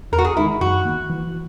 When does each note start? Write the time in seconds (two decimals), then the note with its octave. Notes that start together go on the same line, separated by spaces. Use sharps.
0.12 E2 A#4
0.18 F#4
0.25 G#4
0.37 D#3 G#3 D#4 E4
0.61 F#2 F#4
0.85 D#3 A#3
1.10 E3